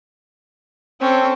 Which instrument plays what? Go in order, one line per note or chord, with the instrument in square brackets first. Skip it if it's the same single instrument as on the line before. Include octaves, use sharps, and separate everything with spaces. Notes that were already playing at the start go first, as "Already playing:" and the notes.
[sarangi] C4 [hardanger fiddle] C#4 A4